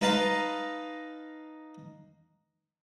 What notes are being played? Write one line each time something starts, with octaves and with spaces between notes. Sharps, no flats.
D#4 B4 F5 A5 A#5 C6